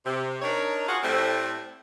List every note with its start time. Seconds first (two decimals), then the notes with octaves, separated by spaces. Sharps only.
0.06 C3
0.42 D4 D#4 A#4 C#5
0.87 F4 F#4 G#4 F5 F#5
1.03 A2 G3 A3 C4